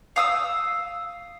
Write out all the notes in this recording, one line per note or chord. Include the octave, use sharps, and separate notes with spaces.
F5 D#6 E6